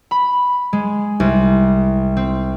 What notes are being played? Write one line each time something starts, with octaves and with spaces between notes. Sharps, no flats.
B5
G#3
C2
C4